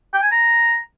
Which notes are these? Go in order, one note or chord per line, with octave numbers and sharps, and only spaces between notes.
G5
G#5
A#5